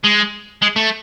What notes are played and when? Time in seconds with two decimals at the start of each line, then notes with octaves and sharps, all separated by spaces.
0.04 G#3
0.62 G#3
0.76 A3